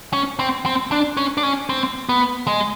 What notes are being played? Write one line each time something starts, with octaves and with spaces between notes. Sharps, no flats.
C#4
C4
C4
D4
C#4
D4
C#4
C4
B3
G#3